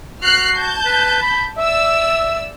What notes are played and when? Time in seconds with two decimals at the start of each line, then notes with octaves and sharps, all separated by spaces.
0.22 F#4 F6 F#6 C7
0.57 A5 G6
0.86 B4
1.22 B5
1.58 D5 E5 E6